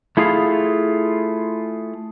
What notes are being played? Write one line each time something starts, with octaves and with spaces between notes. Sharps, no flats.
A3 E4 F4 G#4 F5